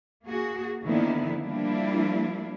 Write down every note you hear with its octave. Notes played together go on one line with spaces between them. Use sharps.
A#3 F#4 G#4
D3 D#3 F3 A#3 B3 E4
F3 G3 A#3 D4 E4 F4